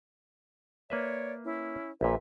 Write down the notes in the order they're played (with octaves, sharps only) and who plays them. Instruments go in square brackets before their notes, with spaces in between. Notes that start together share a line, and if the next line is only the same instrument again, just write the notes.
[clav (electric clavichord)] A#3 B4 E5 [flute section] C#5 D5
[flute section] C#4 E4
[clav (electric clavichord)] A#1 A#2 [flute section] B4 E5